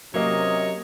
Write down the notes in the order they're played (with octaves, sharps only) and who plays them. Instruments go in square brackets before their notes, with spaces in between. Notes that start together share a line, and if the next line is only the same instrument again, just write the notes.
[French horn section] C3 [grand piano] F#3 A#3 [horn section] C#4 C#5 D#5